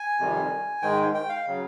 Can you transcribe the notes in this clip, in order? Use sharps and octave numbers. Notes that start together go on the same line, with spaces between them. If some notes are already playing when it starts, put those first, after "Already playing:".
Already playing: G#5
F2 C3 D#3 G3
G#2 D#3 G#3 G5
G5
F5
C#3 F#3